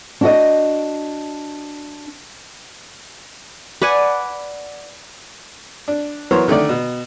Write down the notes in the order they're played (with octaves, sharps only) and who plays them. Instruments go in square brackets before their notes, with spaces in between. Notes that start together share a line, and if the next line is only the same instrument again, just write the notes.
[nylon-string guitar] D4 F#4 D#5
[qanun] B4 D5 F#5 G#5
[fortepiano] D4
E3 F#3 B3 A#4 C5 C#5
D3 D#3 A3 D5
B2